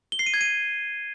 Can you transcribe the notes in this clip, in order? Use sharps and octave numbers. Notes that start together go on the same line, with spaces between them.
G7
C7
D#7
G#6
D#7